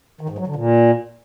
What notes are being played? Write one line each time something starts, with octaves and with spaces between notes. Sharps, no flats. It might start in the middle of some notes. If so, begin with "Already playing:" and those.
D#3
G#2
F#3
D3
A#2